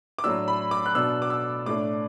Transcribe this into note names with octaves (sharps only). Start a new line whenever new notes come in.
D6
A2 F#3 A3 D4 E6
B5
D6
F#6
B2 B3 D4 E6
D6
E6
A2 A3 D4 D6